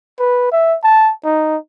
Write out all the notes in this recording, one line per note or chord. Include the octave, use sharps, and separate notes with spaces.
B4
E5
A5
D#4